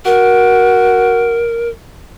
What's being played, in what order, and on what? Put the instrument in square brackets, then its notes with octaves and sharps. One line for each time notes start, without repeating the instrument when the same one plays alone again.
[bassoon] F#4 [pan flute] A#4